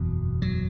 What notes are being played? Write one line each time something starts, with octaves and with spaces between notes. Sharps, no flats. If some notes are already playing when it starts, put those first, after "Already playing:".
Already playing: F#1 E2 B2
F#3